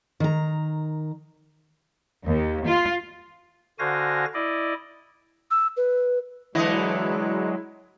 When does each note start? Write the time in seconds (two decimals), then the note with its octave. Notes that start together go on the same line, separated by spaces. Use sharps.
0.20 D#3 A#5
2.26 D#2
2.66 F4
3.79 D3 F#4 C5 F5 G#5 A#6
4.34 E4 D5 D#5
5.51 E6
5.77 B4
6.55 D3 E3 F#3 G#3 E4 D#5